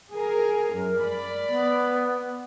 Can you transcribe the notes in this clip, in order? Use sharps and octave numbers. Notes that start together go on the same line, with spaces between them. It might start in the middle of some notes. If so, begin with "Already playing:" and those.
G#4 A#4
F#2 A#4
D5 B5
B3